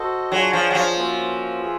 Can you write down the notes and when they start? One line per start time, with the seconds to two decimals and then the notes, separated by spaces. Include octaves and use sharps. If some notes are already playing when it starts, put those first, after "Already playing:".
Already playing: F#4 A4 C5 D#5
0.32 F#3 D4 F4 G#4 C#5
0.53 F3
0.71 F#3
0.75 F3
0.97 A#3 C#4 F#4 B4 E5
1.62 F4 G#4 B4 E5